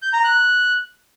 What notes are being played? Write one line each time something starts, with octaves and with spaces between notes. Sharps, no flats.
G6
A#5
F#6